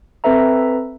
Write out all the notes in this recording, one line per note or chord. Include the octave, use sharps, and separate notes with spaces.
C4 A4 B4 E5 A#5